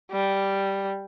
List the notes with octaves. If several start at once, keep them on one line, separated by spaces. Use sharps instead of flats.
G3